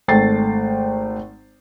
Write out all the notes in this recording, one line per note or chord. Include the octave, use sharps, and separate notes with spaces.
G#1 A3 G5 A6 C7